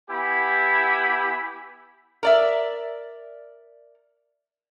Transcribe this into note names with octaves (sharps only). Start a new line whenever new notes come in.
B3 E4 G4 G#5 B5
A#4 D5 E5